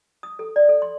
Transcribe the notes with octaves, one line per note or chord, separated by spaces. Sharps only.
D#6
A4
D5
A4
C6